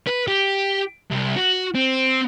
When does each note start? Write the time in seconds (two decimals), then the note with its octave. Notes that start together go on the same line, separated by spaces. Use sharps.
0.07 B4
0.28 G4
1.11 C2
1.36 F#4
1.75 C4